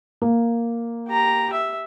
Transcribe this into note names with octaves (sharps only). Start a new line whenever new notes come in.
A#3
G4 A#5
E5